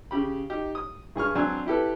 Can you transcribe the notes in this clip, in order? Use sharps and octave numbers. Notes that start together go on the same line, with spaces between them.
C#3 G4 B5
D#4 G4
D#6
G2 G#4 C#6 F6
F#3 C4 D4 G#5 E6
E4 G4 A4 B4